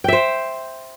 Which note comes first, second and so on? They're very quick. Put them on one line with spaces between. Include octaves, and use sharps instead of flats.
G5 E5 C5